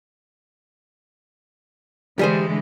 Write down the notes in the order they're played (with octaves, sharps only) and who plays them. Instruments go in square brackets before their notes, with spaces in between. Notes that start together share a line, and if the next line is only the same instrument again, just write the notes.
[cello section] D3 E3 G#3 [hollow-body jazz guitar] G3 G#4 C5